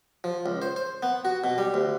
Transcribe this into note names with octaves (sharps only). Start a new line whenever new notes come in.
F3
C#2
C5
C5
B3
F#4
B2
G3
D2